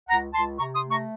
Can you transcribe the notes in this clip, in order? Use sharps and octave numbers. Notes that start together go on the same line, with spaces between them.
C#2 F#5 A#5
C#2 A5 C6
C3 A#5 C#6
C6 D#6
A3
A#5 C#6